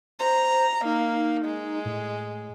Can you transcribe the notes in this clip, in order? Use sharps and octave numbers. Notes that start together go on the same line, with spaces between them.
C5 A#5
A#3 D#4
G#3
A2